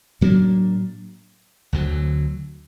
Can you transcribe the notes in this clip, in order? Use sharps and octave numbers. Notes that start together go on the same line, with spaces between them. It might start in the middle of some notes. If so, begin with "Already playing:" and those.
A2 F#3 A#3 D4
D2 D3 F#3